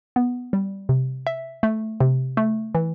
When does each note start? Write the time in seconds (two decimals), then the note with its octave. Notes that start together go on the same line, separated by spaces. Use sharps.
0.16 B3
0.53 G3
0.89 C3
1.27 E5
1.63 A3
2.01 C3
2.37 A3
2.75 E3